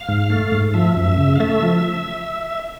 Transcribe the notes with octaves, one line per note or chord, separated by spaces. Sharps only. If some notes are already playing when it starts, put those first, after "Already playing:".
Already playing: F5
G#2
A3
G#2
F3 E5
F#2
C#3
F5
A3 E5
F3